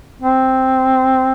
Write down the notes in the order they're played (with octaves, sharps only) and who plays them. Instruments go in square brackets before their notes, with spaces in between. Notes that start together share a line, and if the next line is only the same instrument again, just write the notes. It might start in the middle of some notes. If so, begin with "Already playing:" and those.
[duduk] C4